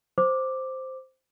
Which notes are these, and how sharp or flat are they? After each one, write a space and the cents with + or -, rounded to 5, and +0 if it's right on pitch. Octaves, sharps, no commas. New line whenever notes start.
C5 +0 D6 +0